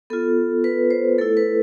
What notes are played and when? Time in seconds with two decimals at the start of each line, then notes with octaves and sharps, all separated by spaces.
0.10 B3 F4 A4
0.64 B4
0.91 C5
1.18 A3 E4 A4
1.37 B4